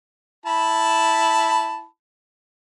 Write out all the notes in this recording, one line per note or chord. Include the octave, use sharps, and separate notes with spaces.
E4 A5 B5